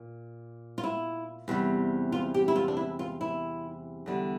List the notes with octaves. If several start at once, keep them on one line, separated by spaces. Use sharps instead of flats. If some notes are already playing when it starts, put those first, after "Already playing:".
Already playing: A#2
F4
E4
E2 C3 G3
F4
G4
E4
F4
D4
E4
F4
E4
E2 D3 G3